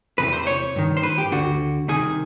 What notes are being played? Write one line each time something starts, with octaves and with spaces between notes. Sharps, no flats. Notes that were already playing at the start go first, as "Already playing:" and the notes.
E2 C3 E3 B4
C5
C#5
G2 D#3
C5
B4
G4
D2 D3 F#4
C2 C3 D#3 G#4